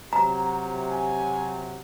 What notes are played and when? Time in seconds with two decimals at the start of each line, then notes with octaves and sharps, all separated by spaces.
0.13 C3 F#3 A#5
0.90 G#5